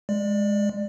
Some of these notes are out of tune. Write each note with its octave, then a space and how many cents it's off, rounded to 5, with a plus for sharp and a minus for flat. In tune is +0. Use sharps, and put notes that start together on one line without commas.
G#3 +0 D5 +20